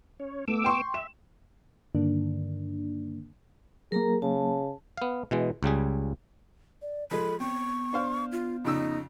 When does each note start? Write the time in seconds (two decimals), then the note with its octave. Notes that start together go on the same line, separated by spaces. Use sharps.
0.20 C#4 C#5
0.48 A3 B3 D6 E6
0.64 G5 C6 C#6
0.94 E5 E7
1.95 G2 D3 D#3 A#3 D4
3.92 F#3 A#3 G#4 A#4 A#5
4.22 C#3 A5
4.97 B3 F5
5.31 B2 E3 G#3
5.63 C#2 C#3 G3 G#4
6.82 D5
7.11 F3 G#3 A4 B5
7.40 B3 C4 C#6
7.93 D4 C5 F5
8.32 F4
8.65 F2 C#3 D#4 E6